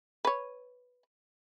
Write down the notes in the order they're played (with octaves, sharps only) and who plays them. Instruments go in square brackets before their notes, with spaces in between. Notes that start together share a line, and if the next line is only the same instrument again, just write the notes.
[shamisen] B4 C#5